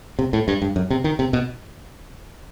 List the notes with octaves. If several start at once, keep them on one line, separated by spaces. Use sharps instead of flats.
C3
A2
G2
G2
F#2
C3
D#3
C3
B2